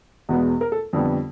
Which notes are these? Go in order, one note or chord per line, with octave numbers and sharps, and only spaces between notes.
E2 B2 G#3 B3
A#4
A4
F2 D3 G3 B3